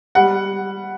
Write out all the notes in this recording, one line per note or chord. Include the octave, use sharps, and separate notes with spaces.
G3 F#5